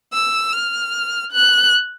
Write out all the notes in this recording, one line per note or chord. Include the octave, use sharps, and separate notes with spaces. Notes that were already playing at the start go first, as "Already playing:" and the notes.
E6
F6
F#6